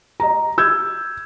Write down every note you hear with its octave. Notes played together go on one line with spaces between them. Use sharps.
D#5 A#5
E6 G6 G#6